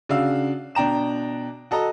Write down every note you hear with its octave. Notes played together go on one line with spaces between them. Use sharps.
C#3 D4 F#4 F5 E6
B2 D4 G5 A#5 E7
F#4 A4 D#5 A#5